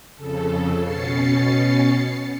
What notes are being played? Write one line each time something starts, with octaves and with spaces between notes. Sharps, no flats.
F2 C#3 A4
B2 C#4 A6 C7 C#7